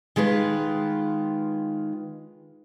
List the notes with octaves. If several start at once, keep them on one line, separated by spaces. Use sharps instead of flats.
D#3 G#3 F4 B4